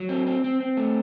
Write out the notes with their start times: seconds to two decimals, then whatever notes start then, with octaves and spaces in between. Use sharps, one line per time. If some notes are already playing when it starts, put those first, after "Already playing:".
Already playing: F#3
0.09 C4
0.27 C4
0.44 C4
0.60 C4
0.77 A3